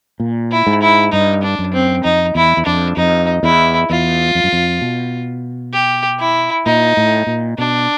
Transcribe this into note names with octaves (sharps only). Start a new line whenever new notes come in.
A#2
E4
G#2
E4
G2 D#4
D4
F#2
C4
F2 D#4
E2 E4
E2
F2 D4
F2 D#4
E2 E4
E2 F4
F2
F#2
F2
B2
G4
E4
A#2 D#4
A2
A#2
B2 D4